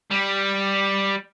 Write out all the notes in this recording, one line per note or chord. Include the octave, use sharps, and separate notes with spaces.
G3